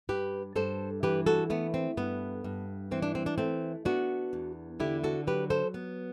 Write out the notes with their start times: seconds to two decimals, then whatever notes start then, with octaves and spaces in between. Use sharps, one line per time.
0.09 G2 G4 B4
0.56 G2 A4 C5
1.03 E3 G4 B4
1.26 F#4 A4
1.50 A3 B3
1.74 C4
1.97 G2 B3
2.44 G2
2.91 E3 C4
3.02 D4
3.15 C4
3.26 D4
3.38 A3 C4
3.85 B3 D4 F#4
4.33 E2
4.80 D3 E4 G4
5.04 F#4 A4
5.27 F#3 G4 B4
5.50 A4 C5
5.74 B3